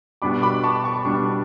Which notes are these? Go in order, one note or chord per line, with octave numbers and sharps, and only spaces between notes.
B2 G3 D4 B5 D6
B5 D6
A5 C#6
A5 C#6
B2 G3 D4